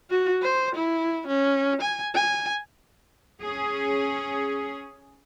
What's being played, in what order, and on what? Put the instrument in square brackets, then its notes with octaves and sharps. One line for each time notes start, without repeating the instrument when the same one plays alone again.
[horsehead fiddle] F#4
C5
E4
C#4
G#5
G#5
[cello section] C#4 G#4